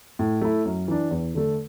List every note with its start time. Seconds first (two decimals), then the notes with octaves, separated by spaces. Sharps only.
0.19 A2
0.41 A3 E4
0.65 F#2
0.88 E3 D4
1.11 E2
1.34 D3 A3